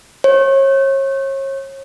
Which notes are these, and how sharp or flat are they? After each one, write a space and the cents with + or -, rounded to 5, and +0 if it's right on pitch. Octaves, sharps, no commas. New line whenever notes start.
C#5 -35